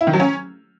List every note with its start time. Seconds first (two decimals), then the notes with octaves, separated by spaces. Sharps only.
0.01 E4
0.07 D#3
0.13 F#3
0.20 C#4